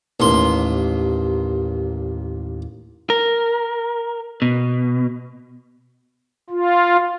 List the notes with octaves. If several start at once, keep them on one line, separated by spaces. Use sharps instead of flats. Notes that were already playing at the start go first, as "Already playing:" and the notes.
A1 D#2 C6
A#4
B2
F4